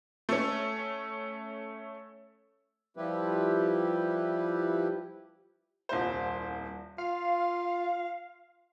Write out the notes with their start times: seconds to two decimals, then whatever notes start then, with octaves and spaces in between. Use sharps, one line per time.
0.29 A3 C#4
2.97 F3 G3 E4 G4 B4
5.89 D#1 C2 C5
6.98 F4 F5